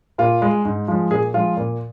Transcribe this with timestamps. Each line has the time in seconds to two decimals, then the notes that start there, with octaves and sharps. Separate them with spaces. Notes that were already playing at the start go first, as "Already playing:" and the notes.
0.18 A#2 F4
0.42 G#3
0.65 G#2
0.88 F3 G#3
1.10 A#2 G#4
1.34 F3 G#3 F4
1.57 A#2